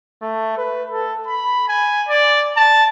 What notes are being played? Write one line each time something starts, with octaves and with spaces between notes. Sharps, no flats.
A3
B4
A4
B5
G#5
D5
A5